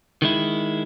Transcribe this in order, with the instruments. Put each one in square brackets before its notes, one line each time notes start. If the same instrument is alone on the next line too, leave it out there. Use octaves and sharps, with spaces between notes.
[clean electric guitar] D#3 G#3 E4